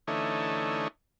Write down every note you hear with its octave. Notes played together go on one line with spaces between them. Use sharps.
D3 E3 A3 C#4 D#4